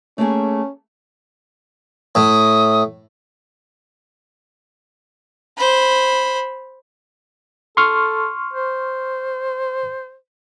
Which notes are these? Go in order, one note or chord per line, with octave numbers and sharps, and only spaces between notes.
A3 A#3 C#4 G#4
A2 D#6
C5 B5
A4 C6 C#6 F6
C5